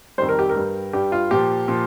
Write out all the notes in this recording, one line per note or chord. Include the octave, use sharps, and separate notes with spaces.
F2 D#3 G3 C5
A#4
G4
A#4
G2 G3
G2 G3 G4
F4
A#2 F3 G4
A#2 F3